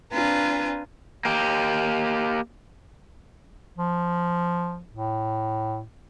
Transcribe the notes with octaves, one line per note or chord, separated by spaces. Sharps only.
C4 D4 F4 B4 G#5 A#5
A#3 G4
F3
A2